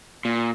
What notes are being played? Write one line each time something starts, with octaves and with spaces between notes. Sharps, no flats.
A#2